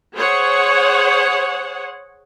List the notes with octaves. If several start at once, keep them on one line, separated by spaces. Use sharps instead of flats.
G#4 C5 C#5 F#5